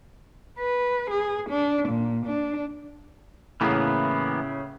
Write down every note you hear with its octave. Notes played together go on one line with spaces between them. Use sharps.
B4
G#4
D4
A#2
D4
A2 C#3 E3 A#3 B3